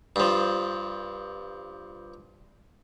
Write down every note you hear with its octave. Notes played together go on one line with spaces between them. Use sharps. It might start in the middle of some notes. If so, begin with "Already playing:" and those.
G2 F3